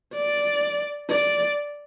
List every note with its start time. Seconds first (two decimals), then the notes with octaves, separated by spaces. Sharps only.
0.14 D5
1.10 D5